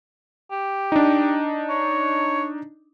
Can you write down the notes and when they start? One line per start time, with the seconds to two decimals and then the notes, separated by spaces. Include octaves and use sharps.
0.51 G4
0.92 D4 D#4
1.69 C#5